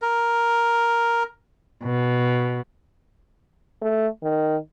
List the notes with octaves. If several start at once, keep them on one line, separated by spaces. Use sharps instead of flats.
A#4
B2
A3
D#3